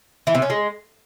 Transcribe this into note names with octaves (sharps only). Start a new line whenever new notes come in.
E3
C3
C#4
G#3